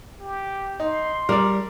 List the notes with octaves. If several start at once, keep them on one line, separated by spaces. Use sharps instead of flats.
G4
D#4 C6
G3 A#4 D5